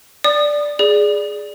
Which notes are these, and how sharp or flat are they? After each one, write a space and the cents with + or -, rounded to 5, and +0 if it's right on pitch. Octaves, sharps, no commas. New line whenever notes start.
D5 +0 D#6 -35
G#4 +0 D5 +0